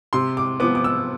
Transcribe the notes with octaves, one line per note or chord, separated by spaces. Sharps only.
C3 C6
D6
F3 B3 D6
D6
E6